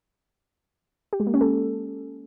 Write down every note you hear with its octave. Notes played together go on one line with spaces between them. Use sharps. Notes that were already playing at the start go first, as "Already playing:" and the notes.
G4
G#3
A#3
C#4
A4